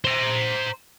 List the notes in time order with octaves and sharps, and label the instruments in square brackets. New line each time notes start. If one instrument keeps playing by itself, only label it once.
[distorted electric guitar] C5 A#5